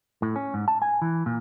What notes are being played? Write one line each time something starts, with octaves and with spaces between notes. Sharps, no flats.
A2
C#4
G#2
A5
G#5
E3
A#2